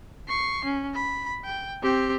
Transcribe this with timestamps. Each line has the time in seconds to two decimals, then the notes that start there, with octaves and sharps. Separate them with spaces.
0.28 C#6 C7
0.65 C#4
0.94 B5
1.45 G5
1.83 C4 G4